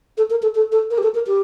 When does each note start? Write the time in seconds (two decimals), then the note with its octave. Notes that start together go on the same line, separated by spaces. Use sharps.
0.18 A4
0.30 A#4
0.42 A4
0.55 A4
0.72 A4
0.90 A#4
0.98 G4
1.03 A4
1.15 A#4
1.27 G4